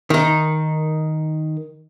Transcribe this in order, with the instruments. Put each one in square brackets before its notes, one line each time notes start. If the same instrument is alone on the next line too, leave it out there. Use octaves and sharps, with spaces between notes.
[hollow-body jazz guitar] D#3 D#4